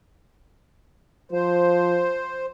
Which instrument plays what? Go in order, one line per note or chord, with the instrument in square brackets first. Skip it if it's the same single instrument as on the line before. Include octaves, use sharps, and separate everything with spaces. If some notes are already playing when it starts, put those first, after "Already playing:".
[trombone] F3 [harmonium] C5